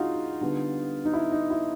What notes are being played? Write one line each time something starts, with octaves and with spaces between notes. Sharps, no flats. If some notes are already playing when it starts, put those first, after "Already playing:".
Already playing: D3 G#3 D#4 F4 F#4
D3 G3 B3 D#4
D#4
E4
D#4
E4